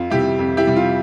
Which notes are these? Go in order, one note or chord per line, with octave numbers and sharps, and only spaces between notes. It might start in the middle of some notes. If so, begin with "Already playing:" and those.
Already playing: F2 F4
C3 G3 E4 G4
F2
E4 G4
C3 G3
F4